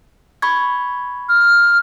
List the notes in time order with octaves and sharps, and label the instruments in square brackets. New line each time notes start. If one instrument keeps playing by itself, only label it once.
[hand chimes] B5 C#6 G#6
[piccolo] F6